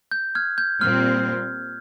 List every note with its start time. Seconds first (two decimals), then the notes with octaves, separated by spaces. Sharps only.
0.11 G6
0.35 F6 G#6
0.58 G6
0.81 A#2 G3 C4 F6